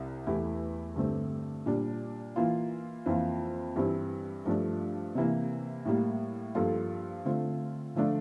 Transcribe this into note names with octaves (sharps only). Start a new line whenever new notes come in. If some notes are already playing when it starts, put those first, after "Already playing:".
Already playing: C2 C3
E2 E3 A3 E4 G4
G2 D3 A3 C4 G4
A#2 G3 D4
E3 A#3 F4
F2 E3 A#3 F4
G2 E3 G3 C4 E4
G2 F3 A3 D4
C3 E3 A#3
A2 G3 A#3
G2 F3 A#3 F4 A4
D3 A3 C4 F4
D3 F3 A3 D4 F4